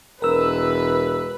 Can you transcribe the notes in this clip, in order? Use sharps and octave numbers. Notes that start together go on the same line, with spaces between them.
E1 A#4 B4 E6